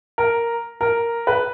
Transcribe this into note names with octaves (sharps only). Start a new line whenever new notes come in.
A#4
A#4
B4